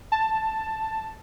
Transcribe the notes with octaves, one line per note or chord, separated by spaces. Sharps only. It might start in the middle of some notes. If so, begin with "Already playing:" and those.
A5